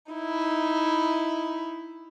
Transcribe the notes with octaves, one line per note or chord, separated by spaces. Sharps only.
D#4 E4